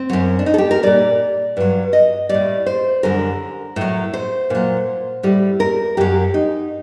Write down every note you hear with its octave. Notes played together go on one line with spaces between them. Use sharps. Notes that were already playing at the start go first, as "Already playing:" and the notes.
Already playing: C4
F#2 F#3
D4
D#4
A4
G4
A#4
A#2 G3 D5
G2 F#3
D#5
A2 G3 D5
C5
F#2 D3 G3 A#4
A2 F#3
C5
A#2 F#3
A2 G3
A#4
F#2 F#3 G4
D#4